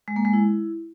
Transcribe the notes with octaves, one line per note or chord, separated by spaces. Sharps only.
G#3
A#3
G#3
E4